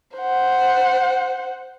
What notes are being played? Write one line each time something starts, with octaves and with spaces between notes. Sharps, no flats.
C5 F#5